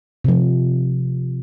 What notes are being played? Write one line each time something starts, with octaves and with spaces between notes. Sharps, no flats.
C3 F3